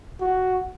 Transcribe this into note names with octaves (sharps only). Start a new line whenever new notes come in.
F#4